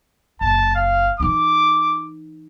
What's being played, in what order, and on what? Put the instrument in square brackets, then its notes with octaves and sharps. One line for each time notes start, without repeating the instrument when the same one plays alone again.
[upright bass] F#1 [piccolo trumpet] A5
[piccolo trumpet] F5
[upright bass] E3 D#4 [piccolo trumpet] D6